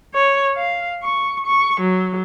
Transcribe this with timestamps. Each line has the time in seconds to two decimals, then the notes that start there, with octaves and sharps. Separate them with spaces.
0.14 C#5
0.57 F5
1.02 C#6
1.46 C#6
1.80 F#3